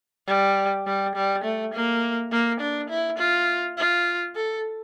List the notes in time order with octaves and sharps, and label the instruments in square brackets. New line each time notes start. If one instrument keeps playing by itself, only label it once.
[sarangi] G3
G3
G3
A3
A#3
A#3
D4
E4
F4
F4
A4